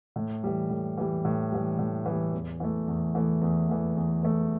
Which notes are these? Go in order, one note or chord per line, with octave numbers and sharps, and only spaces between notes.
A2
E3 G3
A2
E3 G3
A2
E3 G3
A2
E3 G3
E2
E3 A3
E2
E3 A3
E2
E3 A3
E2
E3 A3